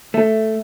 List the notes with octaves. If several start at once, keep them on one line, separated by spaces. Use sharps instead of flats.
A3